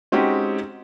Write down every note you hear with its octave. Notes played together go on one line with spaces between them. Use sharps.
G#3 C4 C#4 D#4 F#4 G4